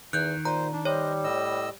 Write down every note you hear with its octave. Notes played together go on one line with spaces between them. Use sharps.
E2 D#3 F#6 G6
A#2 C5 A#5
D4
G3 C5 C#5 D#5
A2 D#5 E6